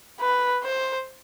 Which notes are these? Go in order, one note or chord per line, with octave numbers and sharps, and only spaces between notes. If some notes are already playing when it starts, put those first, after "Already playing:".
B4
C5